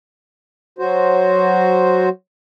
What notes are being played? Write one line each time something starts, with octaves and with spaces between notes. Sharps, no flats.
F#3 F#4 C5